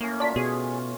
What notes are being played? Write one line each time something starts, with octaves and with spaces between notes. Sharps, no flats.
A2 A#3 C#4
F4 C#5 D5 A5 B6
B2 G#4